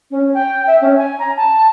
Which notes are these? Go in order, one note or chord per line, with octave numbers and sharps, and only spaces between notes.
C#4
G5
E5
C#4
G#5
A#5
A5